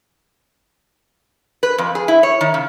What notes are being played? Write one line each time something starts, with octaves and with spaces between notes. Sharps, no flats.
B4
F2
G#4
E4
C#5
D#3
C#3